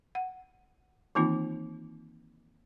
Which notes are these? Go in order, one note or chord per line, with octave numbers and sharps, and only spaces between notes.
F#5
D#3 E3 A#3 C4 D#4 F4